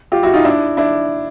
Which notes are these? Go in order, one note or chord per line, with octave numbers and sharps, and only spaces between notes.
F4 G4
E4 F#4
D#4 F4
D4 E4
D4 E4